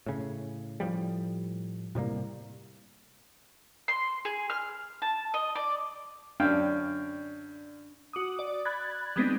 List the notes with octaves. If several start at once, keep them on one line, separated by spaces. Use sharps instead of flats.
A2 C#3
A2 F3 G3
A2 C3 G3 A#3
C6
G#4
F6
A5
D#5
D5
F#2 D4 F5 G5
F#4 D6 D#6
D5
B5 F#6 G#6 A6
G3 G#3 B3 C4 D4 D#4